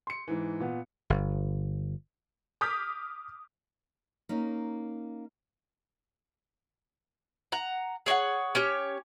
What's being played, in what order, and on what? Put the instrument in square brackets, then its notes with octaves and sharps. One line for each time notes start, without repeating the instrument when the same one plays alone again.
[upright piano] C6 C#7
G#2 E3
A#2 B3
[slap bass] G1
[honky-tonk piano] D6 D#6 F6 G6 B6
[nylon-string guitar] A#3 C#4 D#4
[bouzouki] F#5 A#5
G#4 C#5 D5 F#5
C#4 G4 C#5